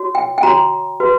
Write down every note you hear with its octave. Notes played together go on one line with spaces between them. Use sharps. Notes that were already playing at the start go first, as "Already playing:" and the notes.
Already playing: F#4 C#5
G5
G5
F#4 C#5 A#5
F#4 B4